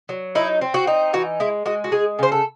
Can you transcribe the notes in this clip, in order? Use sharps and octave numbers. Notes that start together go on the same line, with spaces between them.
F#3
D#4 E4
C4
F#4
D#4
E3 F#4
G#3 E4
G#3 F#4
F#4
G#3 G#4
C#3 C5
A4